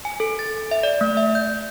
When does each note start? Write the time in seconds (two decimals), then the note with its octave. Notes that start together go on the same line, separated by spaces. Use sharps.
0.05 G#5
0.20 A4
0.39 A6
0.71 E5
0.83 D5
1.01 A3
1.17 E5
1.35 G6